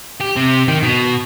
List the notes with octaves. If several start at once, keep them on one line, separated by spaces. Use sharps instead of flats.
G4
C3
D#3
B2